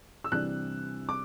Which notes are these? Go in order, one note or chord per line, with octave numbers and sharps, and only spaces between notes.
E6
C3 E3 G3 D4 F#6
D6